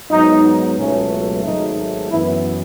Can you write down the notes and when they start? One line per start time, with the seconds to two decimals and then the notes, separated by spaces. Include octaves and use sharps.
0.10 G#2 F#3 B3 D#4
0.77 C#2 B2 F#3 A3 C#4
1.43 G#1 G#2 F#3 A3 D#4
2.09 F#2 E3 B3 E4